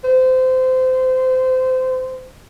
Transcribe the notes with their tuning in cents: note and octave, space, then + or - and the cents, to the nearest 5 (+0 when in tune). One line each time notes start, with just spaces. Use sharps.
C5 -25